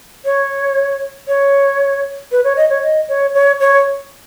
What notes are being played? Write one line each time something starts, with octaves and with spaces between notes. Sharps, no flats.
C#5
C#5
B4
C#5
D#5
C#5
D#5
C#5
C#5
C#5